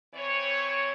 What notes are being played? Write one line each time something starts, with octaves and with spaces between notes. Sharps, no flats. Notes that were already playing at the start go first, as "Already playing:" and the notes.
E3 C4 C#5